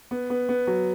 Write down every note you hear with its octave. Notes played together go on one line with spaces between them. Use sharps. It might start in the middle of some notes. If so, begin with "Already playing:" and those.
B3
B3
B3
F#3